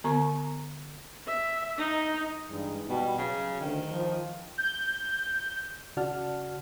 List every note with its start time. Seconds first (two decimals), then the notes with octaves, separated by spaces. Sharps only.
0.04 D3 B3 A#5 C#6
1.27 E5
1.78 D#4
2.50 G2 E3 G#3 D#4
2.89 B2 G3
3.18 C#3 F#3
3.60 D2 D#3
3.91 F3
4.58 G6
5.97 C#3 F#4 D5 F#5 A5 F6